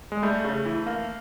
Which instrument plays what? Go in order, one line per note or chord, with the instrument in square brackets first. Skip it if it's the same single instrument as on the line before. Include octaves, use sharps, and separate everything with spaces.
[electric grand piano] G#3
[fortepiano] G3 [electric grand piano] A3
[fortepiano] C#3
E3
A#3